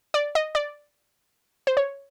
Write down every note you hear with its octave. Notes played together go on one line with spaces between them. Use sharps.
D5
D#5
D5
C5
C#5